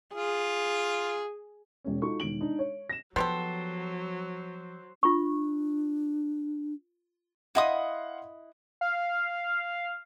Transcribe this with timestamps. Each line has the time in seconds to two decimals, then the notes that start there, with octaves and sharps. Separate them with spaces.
0.15 F4 G#4
1.85 E1 C#4
2.02 D#4 F4 F#4 A4 C#6
2.20 E1 D#3 D7 F#7
2.41 D4 D#4
2.59 C#5
2.89 A#6 E7
3.16 F3 F#3 B3 G4 A4 C5
5.03 D4 F4 C#6
7.55 E4 D#5 F5 F#5 C6 D#6
8.81 F5